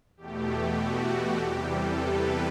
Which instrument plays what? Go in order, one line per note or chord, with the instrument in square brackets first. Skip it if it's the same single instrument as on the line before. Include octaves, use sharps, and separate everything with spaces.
[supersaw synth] E2 B2 A3 G4
F#4
G4
E2 C3 E3 G3 G4
A4
B4